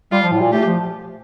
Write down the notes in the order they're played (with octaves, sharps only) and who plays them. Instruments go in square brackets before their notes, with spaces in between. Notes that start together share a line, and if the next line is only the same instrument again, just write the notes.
[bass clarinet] G3 [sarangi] F4
[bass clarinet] F3
A2
A#2
[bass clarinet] A3 [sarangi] G4
[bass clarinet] F3